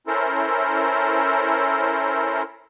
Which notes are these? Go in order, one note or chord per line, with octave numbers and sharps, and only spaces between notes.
C#4 E4 A4 A#4 C5